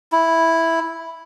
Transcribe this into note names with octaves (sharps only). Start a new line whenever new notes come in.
E4